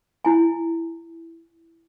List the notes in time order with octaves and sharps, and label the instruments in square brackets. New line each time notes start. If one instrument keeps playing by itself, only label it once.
[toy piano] E4 G#5